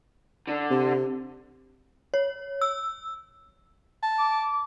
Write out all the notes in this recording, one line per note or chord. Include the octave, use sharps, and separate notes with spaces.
D3
C3
C#5
E6
A5
D6
D6